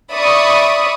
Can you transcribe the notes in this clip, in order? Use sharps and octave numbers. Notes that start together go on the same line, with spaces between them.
D5 E5 B5 C#6 D#6